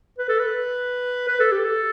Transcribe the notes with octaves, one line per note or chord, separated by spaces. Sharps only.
B4
A4
B4
B4
A4
G4
A4